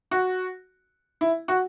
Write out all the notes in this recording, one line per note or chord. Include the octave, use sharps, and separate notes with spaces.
F#4
E4
F#4